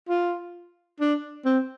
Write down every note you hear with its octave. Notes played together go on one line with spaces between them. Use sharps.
F4
D4
C4